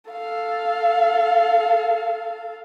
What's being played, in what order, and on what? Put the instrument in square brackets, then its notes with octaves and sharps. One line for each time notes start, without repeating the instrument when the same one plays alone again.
[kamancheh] A4 F5